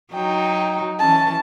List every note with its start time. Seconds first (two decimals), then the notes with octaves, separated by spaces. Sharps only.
0.13 F#3 D#4 G5
0.99 E3 C#4 A5